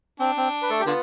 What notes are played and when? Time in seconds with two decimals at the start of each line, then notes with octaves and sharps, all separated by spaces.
0.20 C4 D4
0.37 C4
0.62 B4
0.70 A3 A4
0.80 G4
0.86 D3 B3 F4